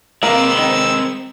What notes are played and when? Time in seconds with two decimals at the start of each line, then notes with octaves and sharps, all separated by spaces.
0.23 G#3 A#3 C4 B4 E6
0.58 D#3